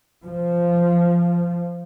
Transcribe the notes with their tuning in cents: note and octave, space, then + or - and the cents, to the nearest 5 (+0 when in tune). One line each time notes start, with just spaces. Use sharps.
F3 -10